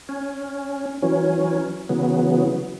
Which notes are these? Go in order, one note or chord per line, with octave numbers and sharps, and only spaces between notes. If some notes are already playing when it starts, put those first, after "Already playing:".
C#4
E3 F#3 C#4
C#3 E3 F#3 B3